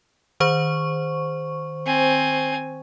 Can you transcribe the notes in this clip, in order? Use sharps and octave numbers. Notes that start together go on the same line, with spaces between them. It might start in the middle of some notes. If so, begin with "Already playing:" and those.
D#3 C5 C#6
C4 G#5